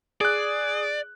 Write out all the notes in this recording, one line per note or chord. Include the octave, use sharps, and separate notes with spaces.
G#4 D5 F#6